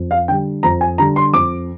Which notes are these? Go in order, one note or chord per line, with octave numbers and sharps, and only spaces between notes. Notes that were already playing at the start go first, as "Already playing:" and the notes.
Already playing: F2
F5
D3 G3 G5
F2 A#5
G#5
D3 G3 A#5
C6
F2 D6